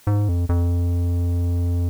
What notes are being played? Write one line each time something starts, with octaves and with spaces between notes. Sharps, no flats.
G#2
F2
F2